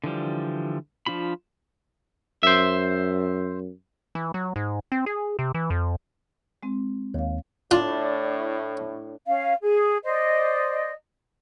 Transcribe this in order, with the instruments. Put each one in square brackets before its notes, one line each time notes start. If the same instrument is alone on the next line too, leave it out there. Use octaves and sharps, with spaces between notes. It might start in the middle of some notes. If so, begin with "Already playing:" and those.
[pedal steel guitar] D3 E3 F3 G3
F3 D4 F4 B5
[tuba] F#2 [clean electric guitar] C5 E5
[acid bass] E3
F#3
G#2
C4
G#4
C3
E3
F2
[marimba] G#3 C4
[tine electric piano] D#2 [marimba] C#5 F5
[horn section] A2 [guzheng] D4 [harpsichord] F4
[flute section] C#4 F5
G#4
C5 D5 D#5